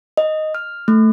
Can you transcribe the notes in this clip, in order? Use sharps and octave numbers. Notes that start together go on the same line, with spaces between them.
D#5
F6
A3